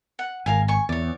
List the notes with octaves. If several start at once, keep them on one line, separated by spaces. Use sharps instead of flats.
F#5
G#1 A#4 F5 G#5
G#5 C#6
E2 C#5 D5